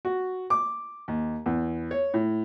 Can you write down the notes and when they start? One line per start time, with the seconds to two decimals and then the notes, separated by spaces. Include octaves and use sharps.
0.05 F#4
0.50 D6
1.08 D#2
1.46 E2
1.91 C#5
2.14 A2